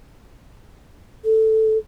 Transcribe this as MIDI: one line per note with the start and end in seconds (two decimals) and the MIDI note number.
1.25 1.78 69